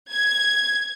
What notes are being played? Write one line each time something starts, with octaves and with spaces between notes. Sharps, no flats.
G#6